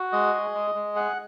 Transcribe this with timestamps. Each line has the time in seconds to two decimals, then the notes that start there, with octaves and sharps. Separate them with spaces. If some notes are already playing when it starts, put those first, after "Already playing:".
Already playing: F#4
0.12 G#3 D#5
0.33 G#4
0.54 G#3
0.75 G#3
0.95 G#4 F#5